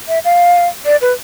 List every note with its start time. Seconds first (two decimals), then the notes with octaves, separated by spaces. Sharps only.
0.08 E5
0.25 F5
0.86 D5
1.02 B4